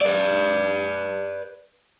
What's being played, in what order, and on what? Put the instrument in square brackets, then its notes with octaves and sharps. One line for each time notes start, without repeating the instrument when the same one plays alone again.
[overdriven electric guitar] B4 D5